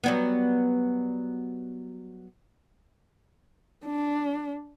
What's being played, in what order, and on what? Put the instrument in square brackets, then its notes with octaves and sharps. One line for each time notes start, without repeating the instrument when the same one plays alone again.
[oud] F#3 G3 B3
[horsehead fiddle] D4